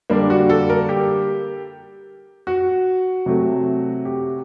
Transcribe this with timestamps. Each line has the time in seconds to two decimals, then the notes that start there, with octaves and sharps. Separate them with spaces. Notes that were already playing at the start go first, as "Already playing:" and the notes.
0.10 D3 G3 A#3 D4
0.30 F#4
0.50 A4
0.70 A#4
0.89 G4
2.47 F#4
3.26 C3 F#3 A3
4.05 G4